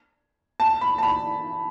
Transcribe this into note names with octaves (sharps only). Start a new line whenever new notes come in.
A5
B5
A5
B5